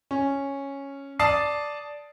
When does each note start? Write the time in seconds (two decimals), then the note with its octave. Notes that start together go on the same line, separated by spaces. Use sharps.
0.11 C#4
1.19 D5 A5 D#6 C7